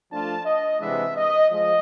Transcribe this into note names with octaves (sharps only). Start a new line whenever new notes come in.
F3 A3 D4 F4 A5
D#5
C3 E3 G#3 B3 D4 E5
D#5
F3 G#3 D#5